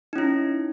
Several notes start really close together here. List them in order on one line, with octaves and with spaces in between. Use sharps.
D#4 C#4 E4